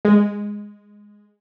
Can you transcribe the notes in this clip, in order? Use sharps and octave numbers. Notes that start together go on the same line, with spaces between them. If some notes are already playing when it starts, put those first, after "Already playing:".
G#3